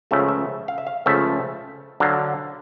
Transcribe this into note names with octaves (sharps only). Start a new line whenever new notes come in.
C#2 C#3 F3 A3 E5
F5
E5
F5
E5
F5
C#2 C#3 F3 A3 E5
D3 F#3 F5